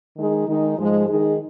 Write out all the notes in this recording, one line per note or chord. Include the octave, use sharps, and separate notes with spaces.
D#3 G#3 D#4 G#4
D#3 G#3 D#4
G#2 F3 G#3
D#3 G#3 D#4 G#4